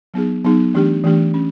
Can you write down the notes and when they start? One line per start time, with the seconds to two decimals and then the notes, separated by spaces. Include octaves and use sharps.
0.14 F#3 B3 D#4 G#4
0.44 F#3 B3 D#4 G#4
0.74 E3 A3 D4 G4
1.04 E3 A3 D4 G4
1.34 C#4